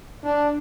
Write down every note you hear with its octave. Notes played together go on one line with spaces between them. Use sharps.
D4